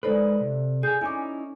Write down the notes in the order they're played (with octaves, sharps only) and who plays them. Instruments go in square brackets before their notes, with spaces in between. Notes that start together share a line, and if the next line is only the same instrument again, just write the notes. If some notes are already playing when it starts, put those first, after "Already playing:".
[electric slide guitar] G#3 D#4 B4 [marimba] A4 C5 D5
[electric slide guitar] C3
[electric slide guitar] G#4 G#5 [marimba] G6
[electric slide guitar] C#4 D#4 E4 [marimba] G#5 D6